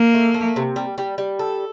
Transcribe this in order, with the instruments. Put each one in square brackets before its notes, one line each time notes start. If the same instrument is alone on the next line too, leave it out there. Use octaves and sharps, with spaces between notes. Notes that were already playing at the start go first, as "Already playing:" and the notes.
Already playing: [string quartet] A#3
[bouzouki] A3
A3
C3
G3
G3
G3
A4